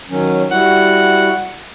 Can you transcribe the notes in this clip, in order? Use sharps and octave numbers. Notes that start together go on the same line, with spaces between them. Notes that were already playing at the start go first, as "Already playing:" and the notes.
D#3 F#3 C#4
G3 E4 F#4 F#5